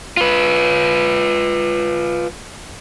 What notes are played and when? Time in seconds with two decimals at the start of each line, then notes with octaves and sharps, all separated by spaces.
0.17 F4 B4